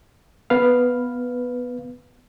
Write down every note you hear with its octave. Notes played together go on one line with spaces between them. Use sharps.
B3 B4 F5